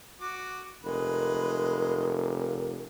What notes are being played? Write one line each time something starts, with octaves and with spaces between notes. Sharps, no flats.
F#4 D6
F1 G#3 A#4 B4